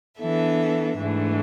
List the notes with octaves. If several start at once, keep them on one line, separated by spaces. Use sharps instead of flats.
E3 B3 D4 A4 E5
G#2 E3 A3 D4